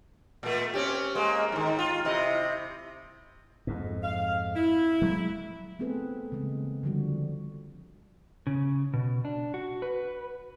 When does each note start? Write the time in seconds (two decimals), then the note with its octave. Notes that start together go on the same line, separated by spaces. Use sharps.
0.43 A#2 A3
0.74 C4 C#4 G4
1.15 G#3 A#3
1.52 G#2 D#3
1.79 F4
2.05 C3 E4 D#5
3.67 F2 G#2
4.03 F5
4.56 E4
5.02 F#3 G#3
5.79 A3 B3 C4 G#4 A4 B4
6.32 C#3 E3 G#3 A#3 C4
6.83 D3 F3 G3 F#4
8.47 C#3
8.93 B2
9.25 D4
9.54 F#4
9.82 B4